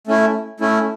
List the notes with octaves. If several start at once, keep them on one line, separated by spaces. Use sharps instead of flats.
A3 C#4 E4
A3 C#4 E4